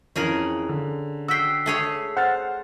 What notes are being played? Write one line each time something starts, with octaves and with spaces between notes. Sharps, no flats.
F2 E3 C#4 G#4 A#4 F#7
D3
F#4 G5 E6 B6 C7
A3 G#4 C#5
C5 F#5 F6 A6